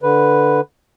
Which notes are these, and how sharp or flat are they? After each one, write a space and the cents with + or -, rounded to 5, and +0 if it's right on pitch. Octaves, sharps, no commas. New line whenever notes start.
D3 +0 B4 +0